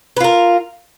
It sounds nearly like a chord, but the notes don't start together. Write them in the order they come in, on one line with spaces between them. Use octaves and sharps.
B4 F4 A#4